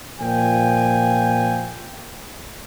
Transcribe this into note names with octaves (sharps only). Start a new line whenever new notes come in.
A#2 F3 G5 G#5